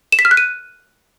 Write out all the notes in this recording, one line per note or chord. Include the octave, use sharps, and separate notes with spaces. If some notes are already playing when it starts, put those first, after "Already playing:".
E7
B6
F6
F#6
D#7